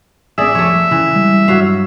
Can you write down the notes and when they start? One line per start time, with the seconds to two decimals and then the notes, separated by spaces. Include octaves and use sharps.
0.38 A1 B3 G#4 D5 E5
0.55 F1 F3 A3 C#5
0.91 C#3 E3
1.15 C#3 G3 G#3
1.48 G2 F#3 F#4 F5